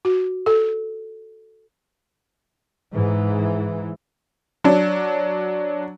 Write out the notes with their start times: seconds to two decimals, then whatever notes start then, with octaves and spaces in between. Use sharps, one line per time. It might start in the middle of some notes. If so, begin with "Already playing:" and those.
0.05 F#4
0.46 A4
2.93 G#2 E3
4.64 F#3 D4